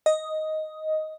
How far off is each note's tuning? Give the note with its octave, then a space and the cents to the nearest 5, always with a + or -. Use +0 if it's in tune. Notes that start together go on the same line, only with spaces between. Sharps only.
D#5 +5